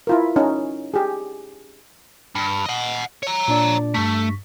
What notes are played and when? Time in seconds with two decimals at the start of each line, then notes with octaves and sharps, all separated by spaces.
0.07 E4 F4 A#4
0.36 C#4 D#4
0.94 G4 G#4
2.35 G2
2.66 D#5 F#5
3.23 C#5 A#5
3.48 A#2 D4 D5
3.94 G2 A3 C#6 B6